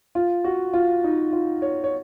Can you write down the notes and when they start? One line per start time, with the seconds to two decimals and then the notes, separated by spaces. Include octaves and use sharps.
0.15 F4
0.44 F#4
0.73 F4
1.04 D#4
1.33 F4
1.62 C#5
1.84 C#5